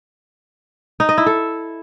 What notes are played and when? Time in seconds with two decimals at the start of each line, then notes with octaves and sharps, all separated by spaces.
1.00 D#4
1.09 D#5
1.18 E4
1.26 A4